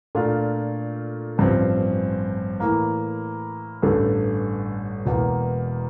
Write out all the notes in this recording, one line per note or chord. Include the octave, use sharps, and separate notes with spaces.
A#2 A3 D4 F4
A1 G2 F3 C4
A2 E3 A#3
A1 G2 D3 A3
E1 E2 E3 A#3